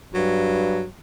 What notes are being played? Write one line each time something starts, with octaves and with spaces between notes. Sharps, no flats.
G2 F#3